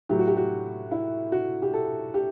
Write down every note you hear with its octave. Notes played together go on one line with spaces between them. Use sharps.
A2 F#3 G4
F#4
G4
F#4
E4
F#4
G4
A4
G4